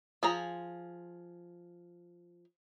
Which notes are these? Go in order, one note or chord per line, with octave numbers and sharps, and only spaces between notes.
F3 G#4 A#5